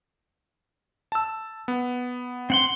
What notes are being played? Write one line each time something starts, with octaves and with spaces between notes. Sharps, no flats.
A5 E6
B3
C4 F#5 C6